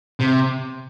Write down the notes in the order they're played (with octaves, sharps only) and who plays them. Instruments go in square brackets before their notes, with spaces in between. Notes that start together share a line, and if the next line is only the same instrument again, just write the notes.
[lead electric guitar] C3